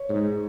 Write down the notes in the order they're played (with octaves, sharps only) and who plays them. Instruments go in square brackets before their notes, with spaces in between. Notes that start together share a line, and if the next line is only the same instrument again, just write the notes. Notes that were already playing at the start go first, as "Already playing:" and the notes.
Already playing: [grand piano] C#5
[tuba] G#2